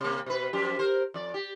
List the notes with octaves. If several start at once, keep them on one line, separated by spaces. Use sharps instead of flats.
C3 A#3
B2 B4
F#2 F3 G4
A#4 C5
F2 D5
G4